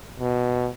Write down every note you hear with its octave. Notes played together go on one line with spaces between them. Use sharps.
B2